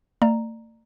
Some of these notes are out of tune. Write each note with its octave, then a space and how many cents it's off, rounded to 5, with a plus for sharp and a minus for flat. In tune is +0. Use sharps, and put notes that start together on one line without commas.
A3 +45 D5 +25 A#5 +0